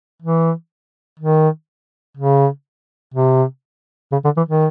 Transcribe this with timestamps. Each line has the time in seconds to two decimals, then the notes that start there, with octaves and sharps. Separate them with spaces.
0.22 E3
1.19 D#3
2.17 C#3
3.14 C3
4.12 C#3
4.24 D3
4.37 E3
4.49 D#3